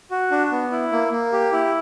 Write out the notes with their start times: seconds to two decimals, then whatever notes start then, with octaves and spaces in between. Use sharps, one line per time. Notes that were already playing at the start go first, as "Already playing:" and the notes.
0.11 F#4
0.31 D4
0.52 B3
0.72 E4
0.92 A#3
1.12 A#3
1.32 G4
1.52 E4